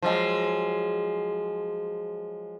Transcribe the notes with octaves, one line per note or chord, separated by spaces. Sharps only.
F3 F#3 G#3